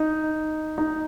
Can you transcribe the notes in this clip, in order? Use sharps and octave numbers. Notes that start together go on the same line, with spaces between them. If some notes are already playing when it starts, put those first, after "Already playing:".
Already playing: D#4
D#4